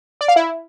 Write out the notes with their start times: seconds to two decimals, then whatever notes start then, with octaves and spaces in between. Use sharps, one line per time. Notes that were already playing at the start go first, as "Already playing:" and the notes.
0.21 D5
0.28 F5
0.36 E4